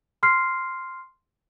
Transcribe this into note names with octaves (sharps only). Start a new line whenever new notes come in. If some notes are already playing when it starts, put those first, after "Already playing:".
C6 F6 C7